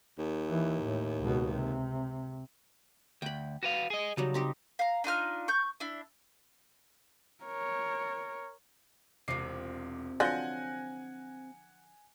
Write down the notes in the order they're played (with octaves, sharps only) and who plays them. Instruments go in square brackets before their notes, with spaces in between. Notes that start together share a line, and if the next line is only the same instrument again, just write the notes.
[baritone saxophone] D#2
[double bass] E3
A2
C#2 B2
C3
[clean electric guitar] D2 [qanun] G5 B5
[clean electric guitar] F#4 B4 F5
G#4 D#5
[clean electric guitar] C#3 [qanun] F#3 G3 D#4
[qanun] C4 D#4 G4
[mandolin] F5 A#5
D4 D#4 F4 F6
C#6 G6
D4 E4
[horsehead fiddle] A#4 C#5
[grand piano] E1 D6 C7 [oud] C3 F4
[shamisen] D3 F3 F#3 [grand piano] F#5 G6 A#6 [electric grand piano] G#5 F#6